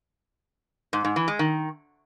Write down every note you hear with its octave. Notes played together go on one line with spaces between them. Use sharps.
G#2
G#2
E3
G#3
D#3